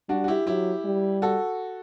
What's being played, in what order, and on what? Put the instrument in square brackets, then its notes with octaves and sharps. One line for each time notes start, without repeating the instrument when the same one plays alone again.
[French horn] G3 [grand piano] D4 F#4
[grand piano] F#4
E4 G4
[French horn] F#3 [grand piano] E4 G4
[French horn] G3
[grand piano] F#4 A4